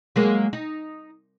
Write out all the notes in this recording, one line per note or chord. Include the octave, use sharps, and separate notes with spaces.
F#3 G#3 A#3
D#4